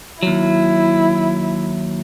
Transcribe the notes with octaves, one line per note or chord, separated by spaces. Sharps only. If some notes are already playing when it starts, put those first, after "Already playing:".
D#2 F#3 E4